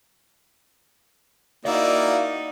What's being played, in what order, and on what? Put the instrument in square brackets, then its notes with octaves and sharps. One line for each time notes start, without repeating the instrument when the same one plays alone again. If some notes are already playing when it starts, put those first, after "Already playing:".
[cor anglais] A#3 [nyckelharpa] D#4 [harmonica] E4 F#4 D5 [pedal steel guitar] D#5 F5 E6